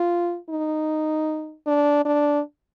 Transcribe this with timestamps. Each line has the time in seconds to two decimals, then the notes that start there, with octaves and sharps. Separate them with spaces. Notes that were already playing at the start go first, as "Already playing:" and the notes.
Already playing: F4
0.50 D#4
1.67 D4
2.05 D4